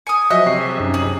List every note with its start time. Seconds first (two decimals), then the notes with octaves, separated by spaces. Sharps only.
0.07 G#5 D#6 C#7
0.30 F3 F#3 F#4 D#5 E5 F#6
0.46 C3 C#6 C7
0.59 G#4 E5
0.80 F#2 C#4 D#4
0.94 G#4